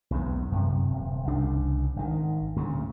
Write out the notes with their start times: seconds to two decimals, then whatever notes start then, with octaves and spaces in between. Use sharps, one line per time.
0.11 B1 E2 G#2 B3
0.52 F#2 C3
0.89 D#1 C3
1.28 C2 C#3 D4
1.96 G#1 D#3
2.56 D2 A#2 C#3